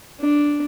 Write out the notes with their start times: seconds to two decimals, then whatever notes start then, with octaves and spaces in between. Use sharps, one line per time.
0.20 D4